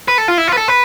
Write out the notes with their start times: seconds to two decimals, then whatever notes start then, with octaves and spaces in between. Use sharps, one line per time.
0.08 B4
0.18 A4
0.28 F4
0.38 E4
0.48 F4
0.53 B4
0.58 A4
0.68 B4